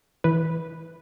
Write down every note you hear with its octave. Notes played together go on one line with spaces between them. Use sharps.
E3 B4